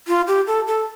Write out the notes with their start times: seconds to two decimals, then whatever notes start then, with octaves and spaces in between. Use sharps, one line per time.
0.08 F4
0.28 G4
0.47 A4
0.67 A4